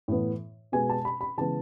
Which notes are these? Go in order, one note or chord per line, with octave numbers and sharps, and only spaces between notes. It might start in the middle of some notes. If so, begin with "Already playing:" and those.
A2 E3 B3
B2 G#3 B3 G#5
A5
B5
B5
C#3 E3 G#3 B3 A5